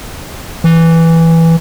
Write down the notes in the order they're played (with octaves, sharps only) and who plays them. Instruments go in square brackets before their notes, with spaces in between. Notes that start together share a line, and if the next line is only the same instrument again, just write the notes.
[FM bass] E3